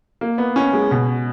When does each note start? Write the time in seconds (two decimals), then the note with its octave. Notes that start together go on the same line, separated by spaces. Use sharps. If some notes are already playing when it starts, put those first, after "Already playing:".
0.21 A#3
0.38 B3
0.56 C#4
0.73 G#3
0.91 B2